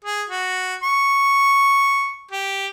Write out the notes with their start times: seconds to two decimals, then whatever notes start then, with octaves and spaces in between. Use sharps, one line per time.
0.05 G#4
0.29 F#4
0.83 C#6
2.31 G4